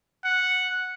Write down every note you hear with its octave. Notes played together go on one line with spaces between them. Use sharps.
F#5